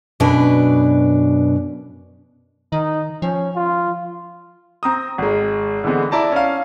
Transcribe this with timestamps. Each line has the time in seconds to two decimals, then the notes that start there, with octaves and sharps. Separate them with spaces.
0.20 F#2 B2 D4 B4
2.72 D#3 D#4
3.22 F3 C#4
3.55 F4
4.83 C4 A#5 D#6
5.18 G#1 G#3
5.84 D3 E3 G#3 B3 C4
6.11 E4 D5 A5 A#5
6.32 C#4 F5